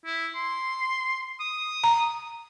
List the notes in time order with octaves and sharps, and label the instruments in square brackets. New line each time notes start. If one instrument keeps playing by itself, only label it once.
[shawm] E4
C6
D#6
[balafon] A#5